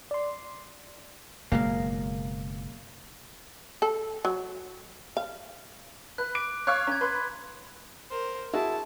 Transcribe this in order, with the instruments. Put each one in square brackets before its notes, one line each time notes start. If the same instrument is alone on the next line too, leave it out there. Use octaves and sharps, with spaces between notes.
[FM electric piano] D5 C6
[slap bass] F#1 B2 G#3 [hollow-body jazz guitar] A#3
[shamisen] A4
F#3
F5
[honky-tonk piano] B4 [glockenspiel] F#6
[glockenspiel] D6 [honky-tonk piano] D7
[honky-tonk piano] C#5 F5 C#6 [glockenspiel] F#6
[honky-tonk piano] C#4 [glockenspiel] A#5 G#6
[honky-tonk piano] B4 C6
[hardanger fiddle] A#4 C5
[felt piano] E4 F#4 G#4 [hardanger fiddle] A5